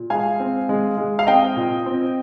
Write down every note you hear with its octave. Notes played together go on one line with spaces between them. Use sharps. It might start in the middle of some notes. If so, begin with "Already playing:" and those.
Already playing: A#2
G#3 F5 G#5
C4
G#3
G#3
F5
C4 D#5 G5
A#2
C4